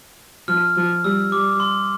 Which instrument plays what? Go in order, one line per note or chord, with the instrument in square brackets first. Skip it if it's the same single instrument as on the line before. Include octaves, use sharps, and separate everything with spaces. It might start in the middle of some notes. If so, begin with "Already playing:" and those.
[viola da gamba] F3 [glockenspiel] F6
[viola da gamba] F3
[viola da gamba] G3 [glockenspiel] E6
[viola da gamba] G3 [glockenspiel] D6
[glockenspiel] C6